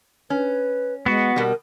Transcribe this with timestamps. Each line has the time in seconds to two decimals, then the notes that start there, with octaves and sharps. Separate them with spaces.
0.30 C#4 B4
1.06 G#3 B3 F#4
1.36 B2 G3 A#4